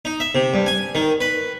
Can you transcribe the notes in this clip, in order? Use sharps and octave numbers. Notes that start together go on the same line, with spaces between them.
D#4
E5
C3
G2
G#5
D#3
B4